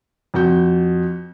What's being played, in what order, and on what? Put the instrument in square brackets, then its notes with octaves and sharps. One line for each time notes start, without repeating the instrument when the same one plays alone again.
[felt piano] F2 F#4 G6